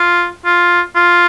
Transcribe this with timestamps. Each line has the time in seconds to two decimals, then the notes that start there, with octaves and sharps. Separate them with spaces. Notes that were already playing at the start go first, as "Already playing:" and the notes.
Already playing: F4
0.46 F4
0.96 F4